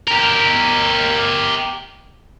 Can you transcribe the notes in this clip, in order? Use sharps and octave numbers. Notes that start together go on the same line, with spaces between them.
G4 A#4